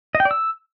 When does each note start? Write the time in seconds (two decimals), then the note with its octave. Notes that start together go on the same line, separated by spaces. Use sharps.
0.15 D#5
0.20 G5
0.25 D5
0.31 E6